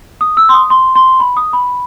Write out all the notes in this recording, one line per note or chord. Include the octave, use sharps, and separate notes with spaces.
D#6
E6
C6
D#6
C6
C6
B5
D#6
B5